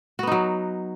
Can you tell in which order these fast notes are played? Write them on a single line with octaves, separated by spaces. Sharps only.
F#4 B3 D#4 F#3